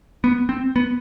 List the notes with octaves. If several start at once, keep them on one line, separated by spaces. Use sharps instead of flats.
B3
C4
B3